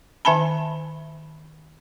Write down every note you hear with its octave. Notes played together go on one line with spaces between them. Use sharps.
D#3 E5 G#5 A5 B5